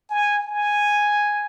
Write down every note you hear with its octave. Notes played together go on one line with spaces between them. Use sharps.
G#5
G#5